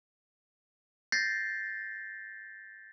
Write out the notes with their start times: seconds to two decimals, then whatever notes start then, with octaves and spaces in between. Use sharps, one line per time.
1.12 G6 A6 A#6 C7